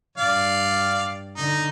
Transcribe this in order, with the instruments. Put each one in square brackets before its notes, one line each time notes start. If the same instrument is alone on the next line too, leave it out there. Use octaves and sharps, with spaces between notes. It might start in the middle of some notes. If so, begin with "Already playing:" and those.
[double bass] G2 [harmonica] D5 F5
[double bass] D3 [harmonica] D#4